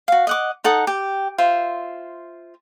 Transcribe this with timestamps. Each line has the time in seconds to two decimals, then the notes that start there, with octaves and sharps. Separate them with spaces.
0.08 F#4 F5
0.27 D#5 F#5 D6
0.64 D#4 A4 F#5 D#6
0.87 G4
1.38 F4 C5 E5